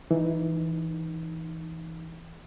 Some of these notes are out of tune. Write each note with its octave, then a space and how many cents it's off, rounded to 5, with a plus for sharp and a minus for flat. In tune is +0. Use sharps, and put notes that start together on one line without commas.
E3 +0 D#4 +0